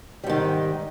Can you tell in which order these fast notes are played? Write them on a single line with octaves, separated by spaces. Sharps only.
G3 G#2 D#3